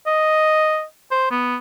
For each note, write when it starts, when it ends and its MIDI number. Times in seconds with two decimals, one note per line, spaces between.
0.07 0.83 75
1.11 1.29 72
1.31 1.56 59